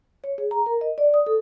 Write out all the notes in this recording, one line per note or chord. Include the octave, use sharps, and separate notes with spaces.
C#5
G#4
A#5
A#4
D#5
D5
D#6
A4